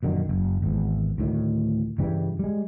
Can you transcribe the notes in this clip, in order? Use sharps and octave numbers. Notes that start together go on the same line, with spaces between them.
A#1 F#2 D3 D#3
F#1
G#1 E2
D2 A2 D#3
G2 C#3 E3 G3
G3 G#3